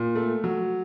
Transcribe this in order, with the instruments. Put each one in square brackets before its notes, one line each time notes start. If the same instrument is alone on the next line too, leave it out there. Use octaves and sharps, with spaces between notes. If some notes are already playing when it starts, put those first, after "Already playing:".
Already playing: [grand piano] A#2
A3
F#3